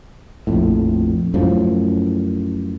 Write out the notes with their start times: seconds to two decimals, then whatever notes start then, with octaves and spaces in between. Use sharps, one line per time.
0.47 A#1 F2 A2
1.34 F#2 A2 F3